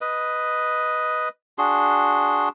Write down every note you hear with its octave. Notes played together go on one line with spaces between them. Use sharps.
B4 D#5
D4 F#4 G#4 C6